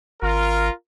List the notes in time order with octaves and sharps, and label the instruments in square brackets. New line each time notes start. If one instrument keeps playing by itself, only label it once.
[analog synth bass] G#1 [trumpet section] F4 A#4